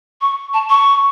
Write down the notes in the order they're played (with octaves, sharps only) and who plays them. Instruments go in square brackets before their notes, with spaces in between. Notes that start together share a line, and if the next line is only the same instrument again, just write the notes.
[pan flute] C#6
A5
C#6